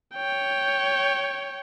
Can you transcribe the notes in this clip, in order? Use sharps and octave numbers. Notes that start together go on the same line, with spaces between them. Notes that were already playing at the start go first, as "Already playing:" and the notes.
C#5 G5